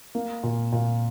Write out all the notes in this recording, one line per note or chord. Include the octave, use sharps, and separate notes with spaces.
A#3
A#2
A#2